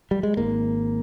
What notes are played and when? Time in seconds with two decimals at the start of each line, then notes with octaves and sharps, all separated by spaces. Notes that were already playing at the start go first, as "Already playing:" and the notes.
0.11 G3
0.23 G#3
0.37 G#1 G#2 A#3